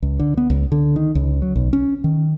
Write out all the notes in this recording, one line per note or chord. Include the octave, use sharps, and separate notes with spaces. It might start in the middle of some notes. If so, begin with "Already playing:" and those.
C#2
D3
B3
C#2
D3
D#3
C#2
F#3
B1
C#4
D#3